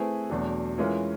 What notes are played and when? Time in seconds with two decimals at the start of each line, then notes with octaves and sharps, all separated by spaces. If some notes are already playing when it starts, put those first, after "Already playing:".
Already playing: A3 C4 E4 G#4 B4
0.30 E2 B2 F#3 A3 D4
0.78 E3 G#3 C#4 F4 A#4